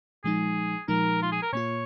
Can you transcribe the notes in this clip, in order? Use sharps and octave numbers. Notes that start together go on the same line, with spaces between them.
A#2 F3 G#3 D#4 G#4
A#2 F3 G#3 D#4 A#4
F4
G#4
A#4
A#2 A#3 F4 C#5